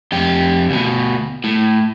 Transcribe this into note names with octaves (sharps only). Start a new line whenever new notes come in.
F2 G4
D2 B2
A2